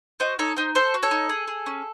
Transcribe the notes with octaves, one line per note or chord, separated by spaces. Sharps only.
F#4 C5 D#5
D#4 A4 C#5
D#4 C5
A4 C5
F#4
A4 C#5
D#4
G#4
G#4
C#4